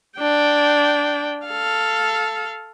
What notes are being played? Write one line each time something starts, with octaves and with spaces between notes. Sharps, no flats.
D4 G5
A4 F5